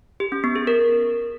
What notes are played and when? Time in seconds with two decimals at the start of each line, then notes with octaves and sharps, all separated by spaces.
0.20 G4
0.32 C#4
0.44 B3
0.56 G#4
0.67 A#4